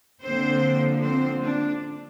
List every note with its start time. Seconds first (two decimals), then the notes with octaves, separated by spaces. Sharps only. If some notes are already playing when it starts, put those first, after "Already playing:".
0.23 D3 F3 A#3 C4 C5
1.03 C4 C5
1.42 D4